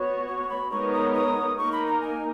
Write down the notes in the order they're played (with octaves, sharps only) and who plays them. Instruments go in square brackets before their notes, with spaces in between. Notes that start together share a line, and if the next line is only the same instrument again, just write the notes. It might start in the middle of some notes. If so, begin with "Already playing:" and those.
Already playing: [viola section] B3 F#4 C#5
[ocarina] C#6
B5
[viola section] G#3 B3 D#4 A#4 C#5 [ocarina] C#6
[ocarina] D#6
D#6
[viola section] A#3 D#4 A#4 [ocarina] C#6
[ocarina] B5
A#5
G#5